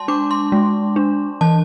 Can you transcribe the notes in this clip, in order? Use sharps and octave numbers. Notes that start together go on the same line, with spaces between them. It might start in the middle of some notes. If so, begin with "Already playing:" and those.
Already playing: G#3 A5 C6
D4 D6
C6
G#3
D4
E3 A5